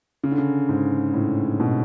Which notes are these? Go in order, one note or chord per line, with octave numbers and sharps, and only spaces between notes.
C#3
D3
C#3
G#2
A2
B2